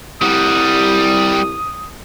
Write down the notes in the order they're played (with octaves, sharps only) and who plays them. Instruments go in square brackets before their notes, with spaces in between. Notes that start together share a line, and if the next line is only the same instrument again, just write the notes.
[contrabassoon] C2 [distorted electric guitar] G3 F#4 [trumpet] D#6